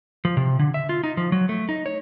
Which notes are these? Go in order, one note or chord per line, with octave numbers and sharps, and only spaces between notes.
F3
C3
D3
E5
F4
D#4
F3
F#3
A3
D#4
C#5